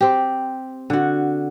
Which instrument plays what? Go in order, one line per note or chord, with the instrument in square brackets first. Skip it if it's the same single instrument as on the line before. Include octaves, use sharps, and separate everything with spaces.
[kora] C4 G4
D3 F#4